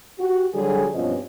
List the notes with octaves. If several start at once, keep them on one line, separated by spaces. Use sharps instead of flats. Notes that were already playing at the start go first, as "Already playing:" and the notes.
F#4 G4
D3 F#3 G3 G#4
G2 B2 F3 C4 C#4 D#5